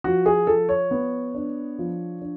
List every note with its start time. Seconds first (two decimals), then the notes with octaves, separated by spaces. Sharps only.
0.04 F3 F#4
0.26 G#4
0.47 F3 A4
0.69 C#5
0.91 B3
1.34 D4
1.79 F3
2.21 D4